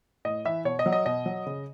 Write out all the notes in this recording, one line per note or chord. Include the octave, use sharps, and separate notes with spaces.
A2 D#5
E3 E5
B2 C#5
D#5
F#3
D#5
B2 D#5
F#3
C#3